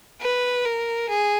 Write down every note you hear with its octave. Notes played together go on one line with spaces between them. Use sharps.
B4
A#4
G#4